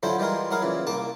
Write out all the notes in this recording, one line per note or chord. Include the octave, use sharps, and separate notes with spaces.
D3 F3 F#3 E4 A4 C5
E3 G3 G#3 F4 A#4
F#3 E4 G#4 A#4 F5
A#2 C#3 E3
C2 A#3 A5 D6